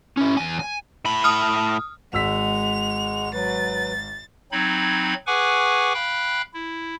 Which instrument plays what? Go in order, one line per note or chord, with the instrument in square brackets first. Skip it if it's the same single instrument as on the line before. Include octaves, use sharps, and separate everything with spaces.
[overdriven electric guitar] C#4 E4
E2 G#5
G#5
A2 B5
[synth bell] D#6 F6
[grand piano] G#1 E6 B6 [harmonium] G#3 F#5 [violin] F7
[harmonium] F#3 B4 [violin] A6
[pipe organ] F#3 C4 D#4 B5 G#6
G#4 B4 F#5 G#5 C#6 D6
F5 G5 B5 F#6
E4